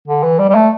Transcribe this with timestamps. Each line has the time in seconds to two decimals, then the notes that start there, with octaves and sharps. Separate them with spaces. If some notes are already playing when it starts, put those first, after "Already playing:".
0.08 D3
0.23 E3
0.39 G3
0.49 G3
0.55 A3